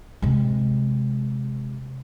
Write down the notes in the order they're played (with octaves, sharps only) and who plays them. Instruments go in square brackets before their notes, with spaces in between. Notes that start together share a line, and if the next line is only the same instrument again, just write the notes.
[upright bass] C3 G#3